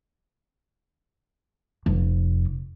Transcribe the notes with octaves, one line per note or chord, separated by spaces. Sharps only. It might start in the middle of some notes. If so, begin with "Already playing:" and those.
F1